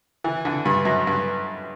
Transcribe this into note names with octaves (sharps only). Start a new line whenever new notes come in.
E3
D3
G2
F#2
G2